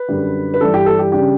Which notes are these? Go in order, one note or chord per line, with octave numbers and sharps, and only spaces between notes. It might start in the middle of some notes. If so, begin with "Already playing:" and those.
Already playing: B4
F#2 D3 G3
B4
G2 E3 G3 D4 A4
G4
A4
G4
C#3 G3 D4 G4